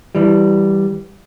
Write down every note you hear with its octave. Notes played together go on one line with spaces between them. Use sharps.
E3 G3